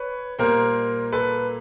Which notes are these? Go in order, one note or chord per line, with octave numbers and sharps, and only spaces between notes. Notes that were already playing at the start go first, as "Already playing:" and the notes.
Already playing: B4 C#5
A#2 G3 A#3 A#4 C5
A4 B4